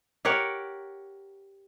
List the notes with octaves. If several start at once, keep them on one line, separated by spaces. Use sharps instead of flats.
G4 A#4 C#5 F#5